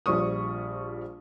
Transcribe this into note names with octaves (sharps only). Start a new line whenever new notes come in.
A#1 F3 G3 C#6 D#6